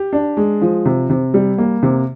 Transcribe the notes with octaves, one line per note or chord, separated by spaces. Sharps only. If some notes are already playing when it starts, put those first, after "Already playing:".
Already playing: G4
D4
G#3
F3
C3
C3
G3
A#3
C3